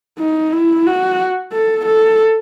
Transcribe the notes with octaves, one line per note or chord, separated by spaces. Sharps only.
D#4
E4
F#4
A4
A4